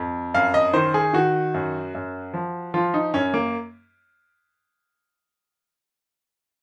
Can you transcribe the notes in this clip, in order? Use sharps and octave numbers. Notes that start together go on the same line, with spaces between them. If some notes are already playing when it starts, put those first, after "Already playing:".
Already playing: F2
F#2 F5
D#5
D#3 C5
G#4
D#3 F#4
F#2
F#2
F3
F3 F4
D#4
F#2 C#4
A#3